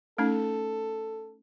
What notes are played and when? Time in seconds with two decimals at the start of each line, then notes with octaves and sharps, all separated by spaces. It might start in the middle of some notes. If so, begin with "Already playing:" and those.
0.18 A3 C#4 D#4 A4